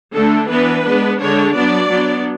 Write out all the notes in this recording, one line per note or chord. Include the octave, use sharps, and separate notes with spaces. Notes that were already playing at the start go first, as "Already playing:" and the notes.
D3 A3 D4 A4
E3 B3 D4 B4
G#3 B3 D4
D3 G#3 D4 C#5
F#3 B3 D4 D5
F#3 B3 D4